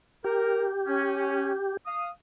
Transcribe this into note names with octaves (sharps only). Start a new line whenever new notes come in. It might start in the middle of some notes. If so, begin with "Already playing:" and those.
G4 A#4
C#4
F5 D#6